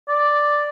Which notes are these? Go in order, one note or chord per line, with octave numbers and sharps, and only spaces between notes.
D5